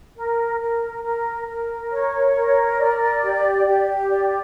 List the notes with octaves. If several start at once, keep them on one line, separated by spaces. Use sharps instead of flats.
A#4
A#4
A#4
A#4
C#5
A#4
D5
G4
G4
D5